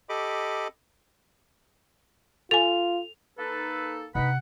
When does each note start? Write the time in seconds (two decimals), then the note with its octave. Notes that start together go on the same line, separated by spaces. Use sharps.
0.09 G4 A4 D#5 B5 D6
2.51 F4 A4 G#5 F7
3.38 A#3 D#4 A4 B4
4.15 C3 D4 D#4 B4 F#5 B5